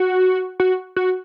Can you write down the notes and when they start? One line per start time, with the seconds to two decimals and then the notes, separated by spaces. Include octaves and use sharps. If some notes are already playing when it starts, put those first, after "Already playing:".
Already playing: F#4
0.60 F#4
0.96 F#4